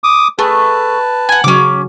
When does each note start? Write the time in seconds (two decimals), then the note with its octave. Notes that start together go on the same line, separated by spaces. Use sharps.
0.04 D6 D#6
0.39 A3 G#4 B4 A5
1.29 F#5 G#5
1.44 C#3 F#3 C#4 D6